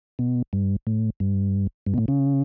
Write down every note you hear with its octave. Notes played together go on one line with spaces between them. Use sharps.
B2
G2
A2
G2
G2
B2
A2
C#3